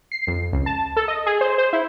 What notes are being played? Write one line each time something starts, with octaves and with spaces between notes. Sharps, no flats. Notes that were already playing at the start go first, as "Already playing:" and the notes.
C7
F2
C#2
A5
A4
D#5
G#4
C5
C5
E4